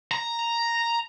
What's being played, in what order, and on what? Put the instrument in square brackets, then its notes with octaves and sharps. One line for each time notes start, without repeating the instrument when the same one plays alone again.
[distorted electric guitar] A#5